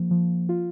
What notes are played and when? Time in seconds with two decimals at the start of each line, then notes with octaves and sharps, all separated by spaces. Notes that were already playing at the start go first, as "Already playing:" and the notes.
Already playing: F3 A#3
0.11 F3
0.49 F4